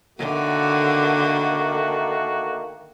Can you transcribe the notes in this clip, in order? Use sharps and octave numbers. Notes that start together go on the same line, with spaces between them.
D3 D#3 A3 A#3 F#4